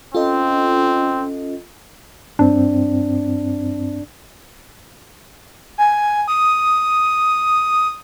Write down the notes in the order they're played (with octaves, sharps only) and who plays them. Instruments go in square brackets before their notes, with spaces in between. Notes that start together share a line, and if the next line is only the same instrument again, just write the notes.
[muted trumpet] C4 [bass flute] C#4 [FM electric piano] F4 A4 D#5
[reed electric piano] G2 C4 [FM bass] D4
[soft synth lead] G#5
D#6